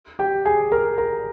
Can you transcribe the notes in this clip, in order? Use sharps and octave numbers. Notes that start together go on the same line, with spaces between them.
G4 G5
G#4 G#5
A#4 A#5
A#4 A#5